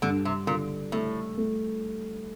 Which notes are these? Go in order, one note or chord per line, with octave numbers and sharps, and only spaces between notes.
G2 D3
C3
A#2 D3
A2 A3
A3